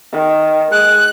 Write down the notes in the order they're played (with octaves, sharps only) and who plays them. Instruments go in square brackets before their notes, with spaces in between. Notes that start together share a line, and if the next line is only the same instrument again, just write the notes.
[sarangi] D#3
[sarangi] G#3 [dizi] F#6